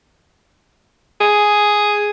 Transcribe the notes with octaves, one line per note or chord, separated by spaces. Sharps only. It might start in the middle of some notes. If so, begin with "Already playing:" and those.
G#4